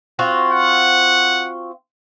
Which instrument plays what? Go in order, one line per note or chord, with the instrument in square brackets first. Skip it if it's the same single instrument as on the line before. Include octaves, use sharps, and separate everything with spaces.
[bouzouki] C4 F4 F#4
[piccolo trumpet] F#5